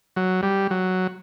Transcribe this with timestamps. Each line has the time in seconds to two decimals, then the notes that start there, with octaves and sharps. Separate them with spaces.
0.16 F#3
0.43 G3
0.70 F#3